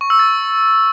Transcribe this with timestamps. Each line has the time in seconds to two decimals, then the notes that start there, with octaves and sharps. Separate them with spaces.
0.01 C#6
0.10 E6
0.19 A6